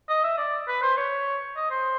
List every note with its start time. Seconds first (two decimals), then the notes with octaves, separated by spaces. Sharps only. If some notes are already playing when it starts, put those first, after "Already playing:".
0.09 D#5
0.24 E5
0.38 D5
0.68 B4
0.83 C5
0.97 C#5
1.56 D#5
1.71 C5